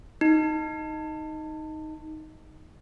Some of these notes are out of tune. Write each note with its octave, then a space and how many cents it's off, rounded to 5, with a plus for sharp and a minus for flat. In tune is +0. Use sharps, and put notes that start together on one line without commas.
D#4 +5